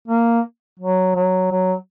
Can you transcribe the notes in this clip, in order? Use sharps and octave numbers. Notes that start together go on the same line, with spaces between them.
A#3
F#3
F#3
F#3